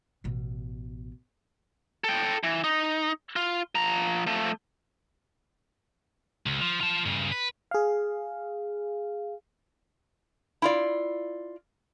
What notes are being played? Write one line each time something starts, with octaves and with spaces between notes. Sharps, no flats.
A1 B2
A4 G5
E3
D#4
F4
F3 A#5
F3 A3
C#2
F3
F4 A5
G2 C#3
B4
G#4 F5
E4 F4 D5